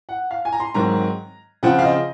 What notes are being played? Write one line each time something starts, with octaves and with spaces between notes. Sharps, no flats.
F#5
F5
G#5
A#5
C6
G#2 D#3 F#3 C4 A#5
C#3 F3 C4 F#5
F5
D#5